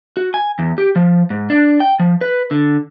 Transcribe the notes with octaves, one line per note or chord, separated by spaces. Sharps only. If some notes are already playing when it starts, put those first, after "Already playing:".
F#4
G#5
E2
G4
F3
G#2
D4
G5
F3
B4
D3